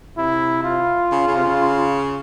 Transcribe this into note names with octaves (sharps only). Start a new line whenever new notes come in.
C3 E4
F4
C#3
C#3
C3
C#3